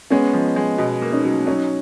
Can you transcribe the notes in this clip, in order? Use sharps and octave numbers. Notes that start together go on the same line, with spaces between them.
G#3 B3 C#4
F3
G#3
B2
A#3
C#4 D#4
F#3
F#3 C#4 D#4